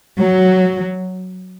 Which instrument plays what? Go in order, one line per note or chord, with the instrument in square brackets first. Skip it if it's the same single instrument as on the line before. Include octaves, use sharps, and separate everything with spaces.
[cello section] F#3